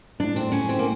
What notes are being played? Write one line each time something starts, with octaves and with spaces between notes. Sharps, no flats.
A2 D4
C4
C#4
C4
A#3